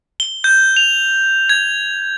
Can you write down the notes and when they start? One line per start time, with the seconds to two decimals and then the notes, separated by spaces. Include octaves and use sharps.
0.20 G7
0.44 G6
0.77 F7
1.49 G#6